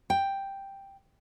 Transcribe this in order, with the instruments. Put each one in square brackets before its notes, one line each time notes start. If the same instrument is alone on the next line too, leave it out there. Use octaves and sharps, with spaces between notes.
[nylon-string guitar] G5